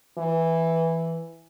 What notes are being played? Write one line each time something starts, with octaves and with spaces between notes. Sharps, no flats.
E3